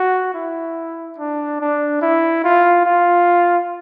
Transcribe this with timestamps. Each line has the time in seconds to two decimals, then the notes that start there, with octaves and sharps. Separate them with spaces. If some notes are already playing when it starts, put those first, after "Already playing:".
Already playing: F#4
0.34 E4
1.18 D4
1.60 D4
2.02 E4
2.44 F4
2.86 F4